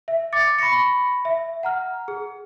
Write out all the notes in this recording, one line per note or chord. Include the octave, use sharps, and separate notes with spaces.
E5
D6 A6 C#7
B5 C#6 A#6 C#7
E5
F#5 A#5 F6
G#4